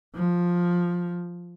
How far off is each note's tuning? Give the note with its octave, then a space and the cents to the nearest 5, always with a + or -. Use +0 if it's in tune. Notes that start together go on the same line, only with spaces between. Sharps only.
F3 +5